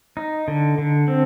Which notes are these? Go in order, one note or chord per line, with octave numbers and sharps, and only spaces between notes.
D#4
D3
D3
C4